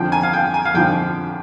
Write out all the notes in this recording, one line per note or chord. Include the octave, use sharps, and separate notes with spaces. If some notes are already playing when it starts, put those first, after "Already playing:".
Already playing: F2 D3 F3 G5
G#5
F5
G5
G#5
F5
F2 D3 F3 G5